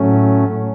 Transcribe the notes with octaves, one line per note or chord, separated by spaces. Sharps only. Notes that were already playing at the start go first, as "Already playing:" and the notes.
Already playing: A2 F#3 A3 C#4